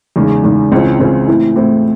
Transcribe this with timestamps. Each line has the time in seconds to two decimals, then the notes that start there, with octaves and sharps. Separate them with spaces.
0.16 E2 C#3 G#3 D#4
0.44 E2 C#3 G#3 D#4
0.72 C#2 C#3 E3 C4
1.00 C#2 C#3 E3 C4
1.28 A2 E3 C4 E4
1.56 A2 E3 C4 E4